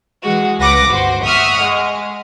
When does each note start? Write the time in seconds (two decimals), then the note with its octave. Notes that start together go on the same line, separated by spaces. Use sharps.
0.23 E3 G#3 F#4
0.59 C#2 B4 F#5 D6 A#6
0.88 G1 F#4 C5
1.25 E5 F#5 C#6 D#6 F6
1.62 G#3